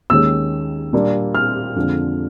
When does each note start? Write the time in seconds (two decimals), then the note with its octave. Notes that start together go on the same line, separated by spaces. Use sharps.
0.10 D#2 D#3 G#3 C#4 E6
0.93 A#2 G3 A#3 D4
1.35 F6
1.76 F2 D3 F3 G#3 C4